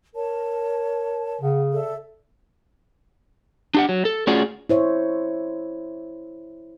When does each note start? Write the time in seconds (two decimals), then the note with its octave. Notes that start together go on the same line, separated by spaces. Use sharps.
0.14 A#4 C#5 A5
1.41 C#3 F#5
1.74 A4 D5 E5
3.74 D4 G4 F#5
3.89 F#3
4.05 A4
4.27 A3 C#4 F4 F#4 G#4 D5
4.69 E4 C5 C#5 E5